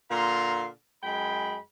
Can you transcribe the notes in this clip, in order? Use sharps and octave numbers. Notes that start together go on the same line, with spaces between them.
A#2 D3 F5 A#5 C6
F#2 G#3 G5 B5